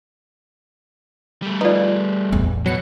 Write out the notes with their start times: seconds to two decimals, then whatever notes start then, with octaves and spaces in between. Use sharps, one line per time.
1.42 G3 A3
1.61 D#4 F4 B4 D5
2.32 A1 E2
2.66 B2 F#3 C#7